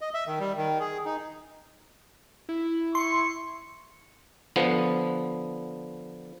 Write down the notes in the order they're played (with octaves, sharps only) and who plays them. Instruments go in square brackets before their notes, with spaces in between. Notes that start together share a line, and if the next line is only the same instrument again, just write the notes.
[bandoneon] D#5
E5
D#3
G3
D#3
G#4
D#4
[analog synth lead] E4
[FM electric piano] C6 [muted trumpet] C#6
[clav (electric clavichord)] D3 F3 B3